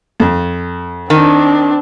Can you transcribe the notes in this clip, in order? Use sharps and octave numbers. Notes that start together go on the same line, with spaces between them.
F2
D#3 C4 D4